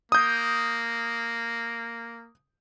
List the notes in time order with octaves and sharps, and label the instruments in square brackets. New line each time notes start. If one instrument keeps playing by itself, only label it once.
[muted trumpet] A#3 [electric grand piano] D#6 G6